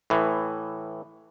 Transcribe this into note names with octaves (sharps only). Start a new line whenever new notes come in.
A2 E3